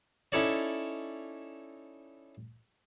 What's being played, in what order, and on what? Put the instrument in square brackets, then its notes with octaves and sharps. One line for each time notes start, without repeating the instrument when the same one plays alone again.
[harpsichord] C#4 D#4 E4 A4 C#5 D5